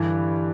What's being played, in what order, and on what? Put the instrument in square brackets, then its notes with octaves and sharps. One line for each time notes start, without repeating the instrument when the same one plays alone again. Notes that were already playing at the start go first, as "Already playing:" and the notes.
Already playing: [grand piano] G2 D3 E3